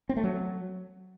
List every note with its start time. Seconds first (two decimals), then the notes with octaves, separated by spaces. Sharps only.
0.09 C4
0.16 A3
0.24 F#3